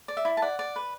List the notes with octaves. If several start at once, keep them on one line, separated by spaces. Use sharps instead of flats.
D5
E5
E4
A5
D5 F#5
D5
B4